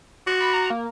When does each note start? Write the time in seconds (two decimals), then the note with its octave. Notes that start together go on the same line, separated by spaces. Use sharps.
0.27 F#4
0.41 B5
0.54 A#5
0.70 A#3